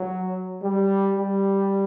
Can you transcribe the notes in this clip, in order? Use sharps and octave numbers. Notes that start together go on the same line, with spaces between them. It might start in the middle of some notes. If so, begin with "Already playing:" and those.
Already playing: F#3
G3
G3